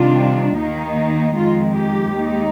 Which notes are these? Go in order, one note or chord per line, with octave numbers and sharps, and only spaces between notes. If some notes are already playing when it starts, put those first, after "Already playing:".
Already playing: C3 D#3 G3 D4 F4
D#2 D#3 A#3 D#4
F2 D#3 G#3 F4
G4
D#2 D#3 G#3 D#4